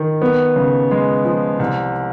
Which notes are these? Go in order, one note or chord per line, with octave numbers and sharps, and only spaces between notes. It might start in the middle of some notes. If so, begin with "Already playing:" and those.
Already playing: D#3
B3
C#3
G#3
F3
C2